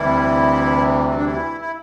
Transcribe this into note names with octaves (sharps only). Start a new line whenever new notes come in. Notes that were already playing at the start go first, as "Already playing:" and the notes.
Already playing: D2 C3 E3 G3 E4
C4
D4
E4
E4